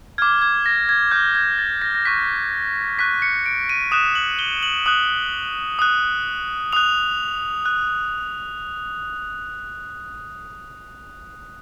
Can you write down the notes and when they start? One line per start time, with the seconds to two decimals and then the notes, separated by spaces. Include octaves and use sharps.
0.18 D6 F6 G#6
0.42 G#6
0.66 A#6
0.89 G#6
1.11 D6 F6 G6
1.35 G#6
1.58 A6
1.82 A#6
1.95 A#6
2.05 C#6 F#6 B6
2.99 C#6 F#6 B6
3.22 C#7
3.46 D7
3.69 D#7
3.92 D#6 F#6 E7
4.15 F#7
4.39 G7
4.63 F#7
4.86 D#6 F#6 F#7
5.79 D#6 F#6
6.73 D#6 F#6 F7
7.66 F#6